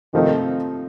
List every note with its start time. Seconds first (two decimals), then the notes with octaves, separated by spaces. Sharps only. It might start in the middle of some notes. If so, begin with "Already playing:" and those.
0.13 C3 D#3 F3 A3 C4 D#4